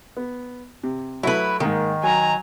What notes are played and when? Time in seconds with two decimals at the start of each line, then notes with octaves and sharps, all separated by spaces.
0.17 B3
0.83 C3
1.23 F#3 A3 E4 F#4 B4
1.60 G#2 D#3 A#3
2.03 F#3 G#5 A#5